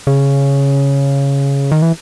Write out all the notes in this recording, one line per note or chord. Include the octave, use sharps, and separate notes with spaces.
C#3
D#3
E3